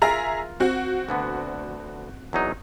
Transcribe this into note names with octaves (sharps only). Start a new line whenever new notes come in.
F4 G#4 A#4 E5 A#5
C4 F#4
D2 D3 B3
E2 F#3 D#4